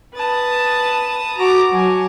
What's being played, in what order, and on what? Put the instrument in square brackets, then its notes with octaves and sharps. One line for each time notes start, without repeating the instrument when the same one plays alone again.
[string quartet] B4 A5 D#6
[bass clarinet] F#4 [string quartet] A#5 D6
[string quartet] F#3 G#5 A5 [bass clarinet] F#4